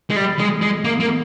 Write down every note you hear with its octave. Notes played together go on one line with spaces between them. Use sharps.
G#3
G3
G#3
G#3
A#3
A#3